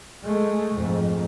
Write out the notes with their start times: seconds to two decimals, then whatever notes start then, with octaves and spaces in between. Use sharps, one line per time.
0.22 G#3 A3
0.74 F2 G#2